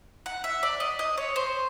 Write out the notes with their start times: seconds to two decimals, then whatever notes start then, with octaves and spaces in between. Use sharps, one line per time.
0.26 F#5
0.44 E5
0.63 D5
0.80 D#5
0.99 D#5
1.17 C#5
1.36 C5